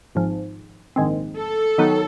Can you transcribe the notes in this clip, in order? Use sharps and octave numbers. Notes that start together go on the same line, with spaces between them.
G#1 G#2 F3
A#1 G#2 D#3 G#3 C4
A4
D#3 F#3 B3 D#4 F#4